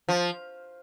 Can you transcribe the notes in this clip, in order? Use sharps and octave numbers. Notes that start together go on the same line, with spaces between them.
F3